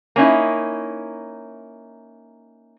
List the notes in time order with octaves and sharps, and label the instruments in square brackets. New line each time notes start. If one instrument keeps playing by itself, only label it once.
[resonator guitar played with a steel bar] A#3 C#4 D#4 E4